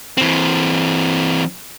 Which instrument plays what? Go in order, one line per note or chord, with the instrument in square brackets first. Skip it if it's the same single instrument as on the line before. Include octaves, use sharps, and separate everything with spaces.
[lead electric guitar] E3 C4